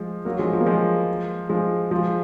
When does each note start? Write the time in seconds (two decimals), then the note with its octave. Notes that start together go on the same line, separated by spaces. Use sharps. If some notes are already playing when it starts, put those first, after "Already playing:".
Already playing: F3 G#3
0.25 F#3 A#3
0.39 F3 G#3
0.53 F3
0.60 A#3
0.66 F3 G#3
1.49 F3 G#3
1.91 F3 G#3